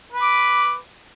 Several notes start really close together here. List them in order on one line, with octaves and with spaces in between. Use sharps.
B4 B5 D6